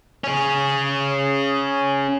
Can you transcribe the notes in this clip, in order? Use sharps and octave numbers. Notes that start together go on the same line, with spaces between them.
C#4 G#4